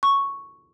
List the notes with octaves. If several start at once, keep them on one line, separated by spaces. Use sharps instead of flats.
C#6